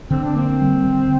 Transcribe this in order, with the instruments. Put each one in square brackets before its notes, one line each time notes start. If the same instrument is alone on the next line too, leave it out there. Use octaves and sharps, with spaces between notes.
[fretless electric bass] D3 [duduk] C4
[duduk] D4
[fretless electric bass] A#3 [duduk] C4
[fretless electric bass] G3
D3